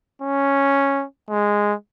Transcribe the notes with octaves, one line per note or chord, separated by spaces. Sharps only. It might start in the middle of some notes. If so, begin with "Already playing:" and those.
C#4
G#3